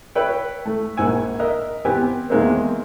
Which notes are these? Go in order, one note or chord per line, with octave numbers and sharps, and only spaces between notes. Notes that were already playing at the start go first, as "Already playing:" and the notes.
B4 C#5 E5 G5
A3
A#1 G#2 F#5 G#5 E6
A#4 D#5 E5
B3 C4 G4 G#5
E2 D#3 G#3 A#3 C4